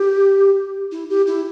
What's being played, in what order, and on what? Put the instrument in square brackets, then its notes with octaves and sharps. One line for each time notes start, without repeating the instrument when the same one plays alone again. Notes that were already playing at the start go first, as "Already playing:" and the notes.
Already playing: [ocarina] G4
E4
G4
E4